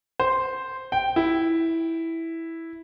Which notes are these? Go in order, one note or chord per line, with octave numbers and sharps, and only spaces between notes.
C5
G5
E4